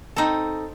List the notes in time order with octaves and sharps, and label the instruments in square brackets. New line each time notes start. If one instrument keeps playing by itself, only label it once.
[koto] C4 D#4 A4